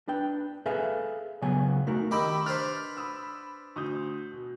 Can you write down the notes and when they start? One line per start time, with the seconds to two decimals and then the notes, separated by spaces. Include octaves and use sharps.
0.08 D4 B4 G5
0.66 G#4 A4 B4 E5 F5 G#5
1.42 C#2 C#3 F#3 B3 G#5
1.87 A3 D#4 F#4 A#4
2.11 D#3 G4 D#5 B5 E6
2.46 D4 B4 C5 F6
2.97 B5 D#6 E6
3.76 D2 D#6 G6
4.32 B2